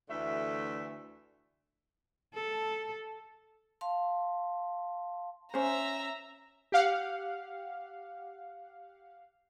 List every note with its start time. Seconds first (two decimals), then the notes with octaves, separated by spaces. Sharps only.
0.09 D2 D3 E3 A3 E5
2.34 A4
3.81 F5 A5 C6
5.54 C#4 C5 E5 A#5
6.72 G4 F5 F#5